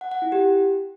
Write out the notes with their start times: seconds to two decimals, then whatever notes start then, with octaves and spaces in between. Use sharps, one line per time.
0.01 F#5
0.11 F#5
0.22 E4
0.32 G4